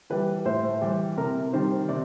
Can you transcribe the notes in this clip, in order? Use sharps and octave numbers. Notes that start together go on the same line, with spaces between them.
E3 G3 B4
A2 C5
E3 G3 G4
C3 A#4
D#3 G3 C5
C3 D5